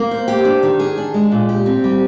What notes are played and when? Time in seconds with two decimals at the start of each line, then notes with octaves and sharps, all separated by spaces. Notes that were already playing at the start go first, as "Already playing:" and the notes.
Already playing: A#3
0.11 C5
0.28 G4
0.45 D4
0.63 D#3
0.80 G#4
0.98 D4
1.14 G#3
1.32 A#2
1.49 G4
1.66 C4
1.84 G3